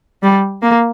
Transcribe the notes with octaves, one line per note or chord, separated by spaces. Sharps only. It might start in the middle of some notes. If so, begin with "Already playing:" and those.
G3
A#3